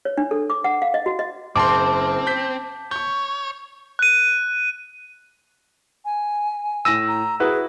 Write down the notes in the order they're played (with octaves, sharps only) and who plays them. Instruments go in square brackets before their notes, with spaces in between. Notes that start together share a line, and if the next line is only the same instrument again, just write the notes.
[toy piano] C#5
D4
A4
D6
F#5
F5
D#5
F#4
D#5
[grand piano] F#1 C6 [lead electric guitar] C4 [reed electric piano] A5 D6
[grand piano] G6 B6
[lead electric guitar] C#5 [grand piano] C#6 G6
[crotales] F#6 D#7
[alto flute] G#5
[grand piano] A2 A#6 D#7 [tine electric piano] E6
[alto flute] A#5
[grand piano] E4 F#4 B4 [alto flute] G#4